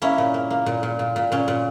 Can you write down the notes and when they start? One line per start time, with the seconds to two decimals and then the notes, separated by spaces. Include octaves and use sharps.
0.02 A#3 C#4 E4
0.18 A#2
0.34 A#3
0.50 A#3
0.66 A#2
0.83 A#2
0.99 A#2
1.16 A#2
1.32 A#2 C#4
1.48 A#2